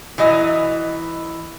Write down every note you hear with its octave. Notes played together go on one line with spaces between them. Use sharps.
E3 F#3 D#5